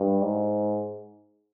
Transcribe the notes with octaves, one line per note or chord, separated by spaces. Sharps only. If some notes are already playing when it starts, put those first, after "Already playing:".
Already playing: G2
G#2